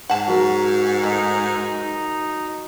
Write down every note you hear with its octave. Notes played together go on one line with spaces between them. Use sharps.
G#2 F#5 A5
F#3 A#4
A3 D#4